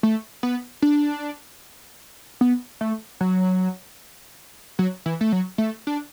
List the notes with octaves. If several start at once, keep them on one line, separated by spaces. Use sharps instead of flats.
A3
B3
D4
B3
A3
F#3
F#3
E3
A3
F#3
A3
D4